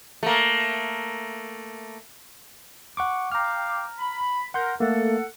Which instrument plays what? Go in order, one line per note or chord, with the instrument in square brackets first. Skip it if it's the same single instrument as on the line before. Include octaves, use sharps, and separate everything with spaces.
[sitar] A3 A#3
[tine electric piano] F#5 C#6 D6
[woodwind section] F5 G5 D6 [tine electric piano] A#5 F6
[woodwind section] B5
[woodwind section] A#4 [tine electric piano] F#5 C6 G6
[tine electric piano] A3 A#3 [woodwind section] A4 F#5